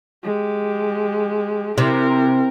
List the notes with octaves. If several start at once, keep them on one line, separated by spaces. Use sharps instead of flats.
G#3 G4
C3 E4 A#4